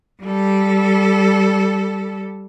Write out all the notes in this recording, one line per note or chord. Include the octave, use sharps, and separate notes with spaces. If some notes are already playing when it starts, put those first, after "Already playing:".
G3 A4